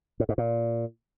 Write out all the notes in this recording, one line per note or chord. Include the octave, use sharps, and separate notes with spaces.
A2
G#2
A#2